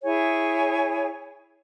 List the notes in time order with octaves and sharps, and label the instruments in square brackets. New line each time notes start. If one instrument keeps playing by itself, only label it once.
[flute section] E4 G#4 C#5 G#5